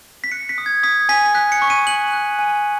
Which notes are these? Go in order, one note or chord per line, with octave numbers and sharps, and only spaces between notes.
B6
F#6 C#7
B6
D#6
G#6
D#6 B6
G#5 B6
F#6 B6
C#7
C#6
D#7
F#6 F#7
F#6
G#5